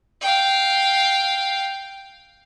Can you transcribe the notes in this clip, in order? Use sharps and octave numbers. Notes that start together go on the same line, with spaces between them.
F5 G5